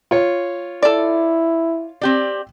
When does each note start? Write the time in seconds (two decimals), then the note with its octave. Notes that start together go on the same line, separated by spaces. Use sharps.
0.11 F4 C#5
0.83 E4 A4 D5
2.01 C4 G4 D5